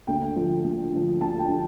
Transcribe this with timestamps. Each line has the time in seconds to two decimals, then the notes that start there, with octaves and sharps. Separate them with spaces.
0.07 D2 G5
0.36 D3 F3
0.64 D2
0.93 D3 F3
1.21 D2 A5
1.39 G5
1.49 D3 F3